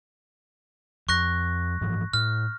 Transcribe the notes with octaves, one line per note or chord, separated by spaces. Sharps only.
F2 C#6 F#6 A#6
G#2 E3 F3
A2 F6